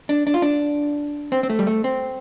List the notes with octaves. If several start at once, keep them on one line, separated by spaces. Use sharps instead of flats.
D4
D4
F4
D4
C4
C4
A3
G3
A3
C4